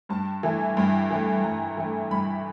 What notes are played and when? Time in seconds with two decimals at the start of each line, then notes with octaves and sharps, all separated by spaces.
0.09 G2 A5
0.43 E3 A3
0.77 G2
1.10 E3 A3
1.44 G2 A#5
1.77 E3 A3
2.11 G2 B5